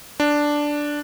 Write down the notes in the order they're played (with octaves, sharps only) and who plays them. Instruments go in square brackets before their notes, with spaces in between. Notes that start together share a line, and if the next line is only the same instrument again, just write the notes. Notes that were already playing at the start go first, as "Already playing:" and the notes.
[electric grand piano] D4